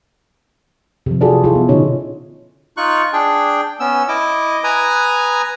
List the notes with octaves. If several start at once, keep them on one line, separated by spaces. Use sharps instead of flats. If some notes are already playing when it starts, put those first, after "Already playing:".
C3 F3
F4 F#4 G#4 A4 B4 D5
E4 F4 G#4 A4
B3
B2 D3 C#4 D#4 C#5
D#4 F4 C#6 F#6
D4 G#4 G5
B3 C#4 E6
E4 D#5 D6
B4 G#5 A#5 D#6